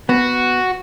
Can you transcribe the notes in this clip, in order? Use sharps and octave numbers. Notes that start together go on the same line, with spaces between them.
B3 F#4